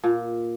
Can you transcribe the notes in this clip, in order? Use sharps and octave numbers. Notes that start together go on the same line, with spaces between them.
A#2